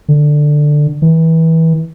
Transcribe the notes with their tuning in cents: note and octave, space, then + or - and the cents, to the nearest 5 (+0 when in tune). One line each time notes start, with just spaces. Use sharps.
D3 +10
E3 -25